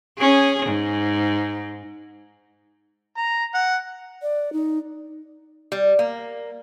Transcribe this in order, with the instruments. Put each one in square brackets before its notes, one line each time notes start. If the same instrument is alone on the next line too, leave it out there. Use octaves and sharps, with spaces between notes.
[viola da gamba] C#4 G#4
G#2
[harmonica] A#5
F#5
[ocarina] D5
D#4
[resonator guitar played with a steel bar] G3
A#3